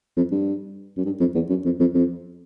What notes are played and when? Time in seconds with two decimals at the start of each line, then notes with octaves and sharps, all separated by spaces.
0.17 F2
0.31 G2
0.97 F#2
1.05 G2
1.20 F2
1.35 E2
1.50 F#2
1.65 F2
1.80 F2
1.94 F2